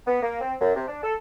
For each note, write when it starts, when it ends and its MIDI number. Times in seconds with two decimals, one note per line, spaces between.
0.07 0.21 59
0.22 0.37 58
0.41 0.54 60
0.60 0.73 42
0.75 0.85 48
0.87 1.02 62
1.03 1.13 69